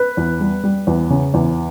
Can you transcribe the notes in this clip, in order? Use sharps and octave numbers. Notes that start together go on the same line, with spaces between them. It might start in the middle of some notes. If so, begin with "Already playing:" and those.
Already playing: B4
E2
G3
G3
E2
C#3
E2